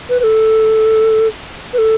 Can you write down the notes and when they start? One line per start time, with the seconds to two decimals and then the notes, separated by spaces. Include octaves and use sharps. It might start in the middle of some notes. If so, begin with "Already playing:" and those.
0.09 B4
0.20 B4
0.23 A4
1.73 B4
1.78 A4